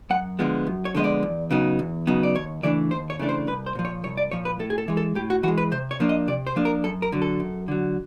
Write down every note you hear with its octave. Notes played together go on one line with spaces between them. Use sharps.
F#2 F#5
D3 F3 G#3 B3
F#2
C#5
D3 F3 G#3 B3 D#5
D5
E2
C#3 F#3 B3 D#4
E2
C#3 F#3 B3 D#4
D5
D#2 C#5
C#3 E3 A3 D4 D5
D#2 C5
C#5
C#3 E3 A3 D4
C5
C2 B4
C5
A#2 F3
C#5
C2 C#5
D5
A#2 F3 C#5
B4
A2 A4
G#4
A4
E3 G#3
A4
A2 G4
F#4
E3 G#3 F#4
B4
C3 C5
C#5
F3 A#3 D4
D#5
C3 D5
C5
F3 A#3 D4
A#4
F#2 A4
A#4
D3 F#3
A4
F#2
D3 F#3